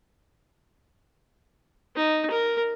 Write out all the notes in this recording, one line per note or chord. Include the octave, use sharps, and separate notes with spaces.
D#4
A#4